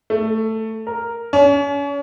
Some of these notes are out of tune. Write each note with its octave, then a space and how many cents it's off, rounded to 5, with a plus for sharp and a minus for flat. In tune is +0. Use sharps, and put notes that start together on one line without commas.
A3 +10
A#4 +0
C#4 +35